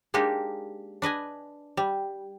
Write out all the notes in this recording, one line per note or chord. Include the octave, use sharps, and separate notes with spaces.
G#3 A#3 D4 D#4 G4
D4 B4 D#5 G#5
G3